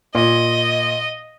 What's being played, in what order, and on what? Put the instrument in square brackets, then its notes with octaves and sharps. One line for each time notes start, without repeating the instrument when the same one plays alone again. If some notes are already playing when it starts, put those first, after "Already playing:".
[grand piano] A#2 [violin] D#5